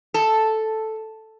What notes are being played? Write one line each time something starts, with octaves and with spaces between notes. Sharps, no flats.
A4